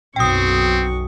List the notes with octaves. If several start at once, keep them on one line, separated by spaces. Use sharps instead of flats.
B1 F#2 C4 F#4 G5 C#6 D#6